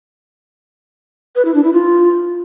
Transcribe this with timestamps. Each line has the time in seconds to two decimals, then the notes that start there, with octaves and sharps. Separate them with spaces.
1.36 B4
1.45 E4
1.54 D4
1.64 E4
1.73 F4